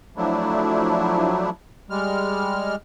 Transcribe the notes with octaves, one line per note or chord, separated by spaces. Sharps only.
F3 F#3 A3 D4 E4
G3 G#3 F6